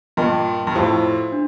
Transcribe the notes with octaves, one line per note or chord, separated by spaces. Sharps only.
G2 A#2 A#4 D#5 G5 C6
G2
F2 A2 G4 C5 F5 C6
D4